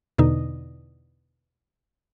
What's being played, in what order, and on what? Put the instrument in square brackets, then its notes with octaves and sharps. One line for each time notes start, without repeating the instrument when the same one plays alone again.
[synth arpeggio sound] E2 B2 D3 D#4